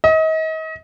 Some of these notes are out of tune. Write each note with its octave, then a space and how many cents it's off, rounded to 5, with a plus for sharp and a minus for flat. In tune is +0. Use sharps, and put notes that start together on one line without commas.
D#5 +35